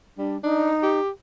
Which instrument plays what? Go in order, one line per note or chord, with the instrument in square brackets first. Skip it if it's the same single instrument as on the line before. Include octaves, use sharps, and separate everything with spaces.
[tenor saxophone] G3 [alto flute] D4
[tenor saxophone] D4 [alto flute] D#4
[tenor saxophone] G4